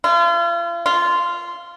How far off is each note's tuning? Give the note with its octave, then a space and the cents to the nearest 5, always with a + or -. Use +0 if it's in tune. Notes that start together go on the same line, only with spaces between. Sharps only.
F4 -40
F4 -10